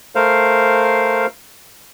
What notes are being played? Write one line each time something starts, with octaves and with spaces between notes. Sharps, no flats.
A3 A#4 C5 F5